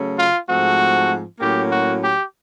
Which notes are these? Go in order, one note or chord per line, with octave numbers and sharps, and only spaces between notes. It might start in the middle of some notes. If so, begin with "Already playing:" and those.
Already playing: C#3 F#3 A3 C#4
F4
G#2 F3 A3 C4 F#4
A2 F#3 A#3 C#4 G4
F#4
G4